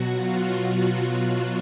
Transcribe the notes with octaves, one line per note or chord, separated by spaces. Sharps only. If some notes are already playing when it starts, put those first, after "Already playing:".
Already playing: B2 F#3 F#4
F4
F4
F#4